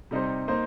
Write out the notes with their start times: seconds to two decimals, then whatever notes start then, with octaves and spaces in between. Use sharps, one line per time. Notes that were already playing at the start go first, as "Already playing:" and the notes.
0.11 C3 G3 D#4 C5
0.48 A#3 D#4 C5